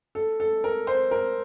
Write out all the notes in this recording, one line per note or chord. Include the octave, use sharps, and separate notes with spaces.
A4
A4
A#4
C5
A#4